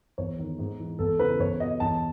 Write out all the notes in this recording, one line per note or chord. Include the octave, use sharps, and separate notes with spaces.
E2 C#5
D#3
G#2
E3
E2 A4
C#3 E3 B4
E2 C#5
B2 D#5
E2 A5